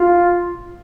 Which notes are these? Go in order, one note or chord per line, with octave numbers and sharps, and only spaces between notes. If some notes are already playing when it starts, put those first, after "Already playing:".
Already playing: F4